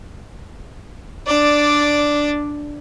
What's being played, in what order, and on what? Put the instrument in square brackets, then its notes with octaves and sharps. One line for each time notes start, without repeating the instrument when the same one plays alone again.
[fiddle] D4 D5